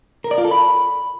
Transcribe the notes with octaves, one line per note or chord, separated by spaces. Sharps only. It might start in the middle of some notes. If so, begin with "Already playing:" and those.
A#4
D5
F4
A4
B5